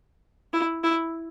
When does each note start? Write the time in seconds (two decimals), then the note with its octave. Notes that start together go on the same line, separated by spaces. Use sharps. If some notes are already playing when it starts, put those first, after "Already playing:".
0.53 E4
0.84 E4